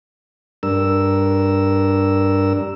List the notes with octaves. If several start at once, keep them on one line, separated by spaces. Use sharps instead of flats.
G2 D4 A#4 E6